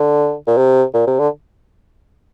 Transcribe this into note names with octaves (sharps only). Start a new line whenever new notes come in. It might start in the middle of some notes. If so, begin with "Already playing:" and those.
Already playing: D3
A#2
C3
A#2
C3
D3